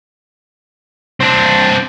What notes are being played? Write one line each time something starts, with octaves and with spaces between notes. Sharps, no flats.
C4 D4